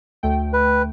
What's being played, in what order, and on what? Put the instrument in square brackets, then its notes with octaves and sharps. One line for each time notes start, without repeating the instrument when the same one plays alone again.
[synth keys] D2 A3 G5
[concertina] B4